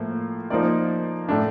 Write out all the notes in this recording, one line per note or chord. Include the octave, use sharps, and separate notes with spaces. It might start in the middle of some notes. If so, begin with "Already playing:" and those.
Already playing: A2 F3 A#3 F4
F3 A#3 D#4 A#4 D5
A2 A3 D4